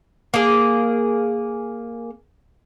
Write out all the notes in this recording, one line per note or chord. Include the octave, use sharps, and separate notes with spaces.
A#3 G#4